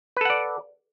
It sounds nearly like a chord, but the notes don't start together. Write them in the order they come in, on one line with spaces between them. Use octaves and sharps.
B4 A4 F#5 D5